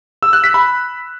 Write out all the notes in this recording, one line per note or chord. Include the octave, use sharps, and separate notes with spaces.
E6
F#6
B6
B5